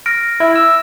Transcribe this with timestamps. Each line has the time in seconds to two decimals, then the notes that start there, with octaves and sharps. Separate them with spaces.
0.06 F6 A#6 D7
0.40 E4
0.56 E6